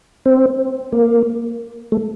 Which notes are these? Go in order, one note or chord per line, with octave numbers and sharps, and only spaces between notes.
C4
A#3
A3